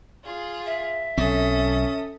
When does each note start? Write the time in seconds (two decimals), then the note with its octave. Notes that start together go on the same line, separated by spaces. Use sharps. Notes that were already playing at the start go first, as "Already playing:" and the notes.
0.24 F4 G#4
0.66 E5
1.18 B1 F#3 C4 C#4 A4 D#6